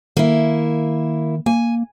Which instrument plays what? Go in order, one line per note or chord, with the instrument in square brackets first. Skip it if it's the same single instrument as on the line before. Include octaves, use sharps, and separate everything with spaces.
[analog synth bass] D#3 [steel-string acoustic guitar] A#3 E4
[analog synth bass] A#3 [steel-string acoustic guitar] G#5